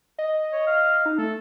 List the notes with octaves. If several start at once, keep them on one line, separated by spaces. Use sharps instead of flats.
D#5
C#5
F5
D#4
A3 A4